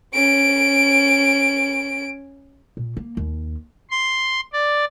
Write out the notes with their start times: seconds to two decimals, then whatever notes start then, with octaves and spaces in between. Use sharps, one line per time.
0.14 C#4 D7
2.77 A#2
2.97 A#3
3.17 D#2
3.90 C6
4.53 D5